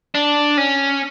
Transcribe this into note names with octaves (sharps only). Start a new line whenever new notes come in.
D4
C#4